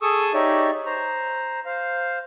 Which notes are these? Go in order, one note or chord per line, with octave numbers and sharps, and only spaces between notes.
G#4 A4 C#6 D#6 E6
D#4 G4 C#5 D5 E5
C5 A#5
C5 F5